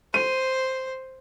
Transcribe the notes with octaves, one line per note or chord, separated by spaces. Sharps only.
C5 D#7